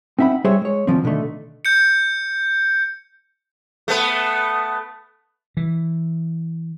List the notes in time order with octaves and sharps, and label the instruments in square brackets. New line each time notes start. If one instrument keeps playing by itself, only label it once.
[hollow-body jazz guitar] C4 D#4 E5 F#5 B5
G3 G#4 C5 C#5 E5
G#3 C#5
D2 C#3 F3 C4
B2 D3 D#3 A3
[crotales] G6 C#7
[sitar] A3 B3
[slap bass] E3